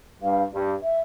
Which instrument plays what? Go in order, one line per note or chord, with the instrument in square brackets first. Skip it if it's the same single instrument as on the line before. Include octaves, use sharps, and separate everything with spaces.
[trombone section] G2 [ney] F5
[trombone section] G2
[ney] E5